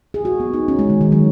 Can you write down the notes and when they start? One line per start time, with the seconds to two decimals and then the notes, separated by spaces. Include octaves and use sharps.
0.14 G#4
0.25 F#4
0.40 B3
0.54 D#4
0.68 C#4
0.79 G#3
0.90 D#3
1.01 D#3
1.12 F#3